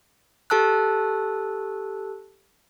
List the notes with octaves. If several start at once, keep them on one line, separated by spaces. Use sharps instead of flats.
G4 A4 A5 E6 F#6